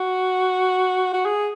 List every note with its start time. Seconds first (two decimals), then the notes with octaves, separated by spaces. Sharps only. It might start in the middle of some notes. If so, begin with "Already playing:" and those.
Already playing: F#4
1.13 F#4
1.25 G#4